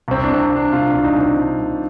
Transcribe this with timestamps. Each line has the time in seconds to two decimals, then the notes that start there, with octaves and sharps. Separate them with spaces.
0.08 C2 C4
0.24 C3 D4
0.33 C4
0.40 D4
0.50 C2
0.56 D4
0.72 C3 F4
0.88 D4
0.93 C2
0.99 D4
1.04 D#4
1.14 C2
1.20 C4
1.37 C2 D4
1.58 C2